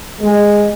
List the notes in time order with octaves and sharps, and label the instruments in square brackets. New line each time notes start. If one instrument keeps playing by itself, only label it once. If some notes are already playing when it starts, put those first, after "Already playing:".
[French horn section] G#3